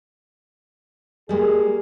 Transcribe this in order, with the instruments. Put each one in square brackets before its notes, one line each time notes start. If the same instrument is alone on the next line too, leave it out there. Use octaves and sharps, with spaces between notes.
[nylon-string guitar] G3 G#3 A#3 [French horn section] G#4